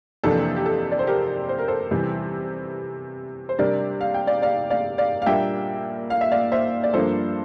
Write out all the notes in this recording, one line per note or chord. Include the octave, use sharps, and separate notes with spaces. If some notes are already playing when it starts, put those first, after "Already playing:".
F2 C3 E3 A#3 D4 A4
G4
A4
D5
C5
G4 A#4
C5
A#4
A4 C5
E2 C3 E3 G3
C5
C3 G3 D4 A#4 D5
F5
G5
D5 F5
D5 F5
D5 F5
D5 F5
F5
A#2 G3 A#3 D4 E5 G5
F5
E5
D5 F5
C5 E5
D5
G2 F3 A#3 D4 A4 C5